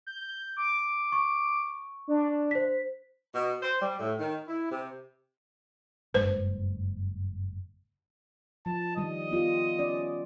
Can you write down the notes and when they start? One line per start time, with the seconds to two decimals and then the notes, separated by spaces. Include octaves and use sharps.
0.07 G6
0.57 D6
1.12 C#6
2.08 D4
2.51 C5 B6
3.34 B2
3.62 C5
3.82 G3
4.00 A2
4.19 D#3
4.48 E4
4.69 C3
6.14 F#1 G2 G#3 B4 C5
8.66 F3 A5
8.97 D#3 G3 D#5
9.31 B3 F4 G4
9.79 C#4 D5